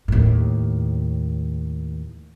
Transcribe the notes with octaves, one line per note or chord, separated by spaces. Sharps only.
D#2 A2